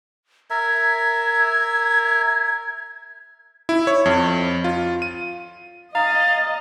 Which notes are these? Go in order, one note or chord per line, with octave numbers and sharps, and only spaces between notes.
A#4 E5 G#6
E4
C#5
F2
F4
D#7
D#5 F5 A#5 A6